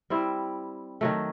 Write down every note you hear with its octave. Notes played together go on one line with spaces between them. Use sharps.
G3 C4 E4
D#3 F#3 A3